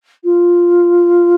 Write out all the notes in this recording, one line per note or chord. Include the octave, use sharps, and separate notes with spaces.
F4